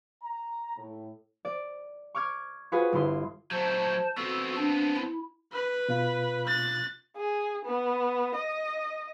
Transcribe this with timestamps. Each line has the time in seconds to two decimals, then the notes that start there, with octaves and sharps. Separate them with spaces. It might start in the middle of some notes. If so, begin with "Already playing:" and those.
0.23 A#5
0.77 A2
1.45 D5
2.15 C#6 D6 F6 G#6
2.72 F4 F#4 G#4 B4
2.92 G1 E4 C6
3.51 F#3 A3 C5 A5
4.17 B3 C4 F#4 A4
4.57 D4
4.96 E4
5.53 B4
5.89 B2 F4
6.47 F#6 A6
7.17 G#4
7.66 B3
8.35 D#5